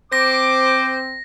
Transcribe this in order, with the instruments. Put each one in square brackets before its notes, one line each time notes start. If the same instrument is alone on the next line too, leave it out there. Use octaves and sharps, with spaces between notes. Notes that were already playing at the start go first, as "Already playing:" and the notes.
[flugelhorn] C4 [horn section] C5 [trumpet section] D6 [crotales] A#6